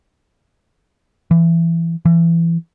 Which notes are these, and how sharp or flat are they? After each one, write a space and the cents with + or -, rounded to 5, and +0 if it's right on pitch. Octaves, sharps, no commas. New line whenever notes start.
E3 +20
E3 +25